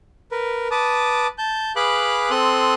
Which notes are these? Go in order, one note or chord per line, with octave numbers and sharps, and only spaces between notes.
A#4 B4
B4 A5 D6 D#6
A5 G6
G#4 B4 F5 B5 D6 F#6
C4 A4 C6 D#6 F#6